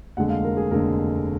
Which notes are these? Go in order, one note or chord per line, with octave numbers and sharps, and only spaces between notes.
F1 D#2 D3 G#3 F#5
F5
A#4
G#4
F1 D#2 D3 G#3 A#4